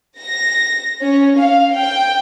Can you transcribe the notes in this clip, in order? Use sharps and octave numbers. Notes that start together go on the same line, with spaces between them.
A#6
C#4
F5
G5